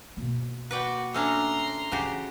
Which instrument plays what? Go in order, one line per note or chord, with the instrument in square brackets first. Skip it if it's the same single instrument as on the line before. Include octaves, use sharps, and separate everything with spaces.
[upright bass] B2 A#3
[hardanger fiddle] F#4 [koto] B4 D5 G5
[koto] A3 C#4 D4 [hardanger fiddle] A#5 C6
[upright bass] E2 E3 [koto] C#3 F#4 G4